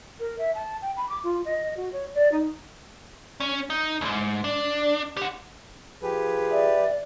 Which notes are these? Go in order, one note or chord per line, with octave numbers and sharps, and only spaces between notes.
A#4
E5
A5
G5
B5
D6
F4
D#5
F#4
C#5
D5
D#4
C#4
D#4
C#2 G#2
D4
G4 F#5
F3 G4 G#4 B4
D5 E5